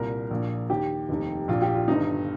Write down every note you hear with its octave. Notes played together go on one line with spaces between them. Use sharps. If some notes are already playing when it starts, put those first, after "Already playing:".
Already playing: C2 A#2 A#4
A#1 A#2
D#2 D#3 G4
F1 D#2 D#3
A#1 A#2 F4
G4
F4
G1 G2 D#3 D#4